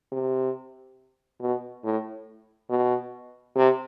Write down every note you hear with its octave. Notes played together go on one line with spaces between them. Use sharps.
C3
B2
A2
B2
C3